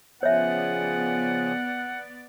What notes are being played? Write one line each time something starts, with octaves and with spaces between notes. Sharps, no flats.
C#3 F3 B3 G#4 C#5 D5 E5 F#5